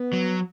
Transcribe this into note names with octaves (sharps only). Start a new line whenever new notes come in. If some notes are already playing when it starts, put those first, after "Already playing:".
Already playing: B3
F#3